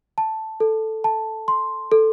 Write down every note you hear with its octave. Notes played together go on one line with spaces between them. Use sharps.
A5
A4
A5
C6
A4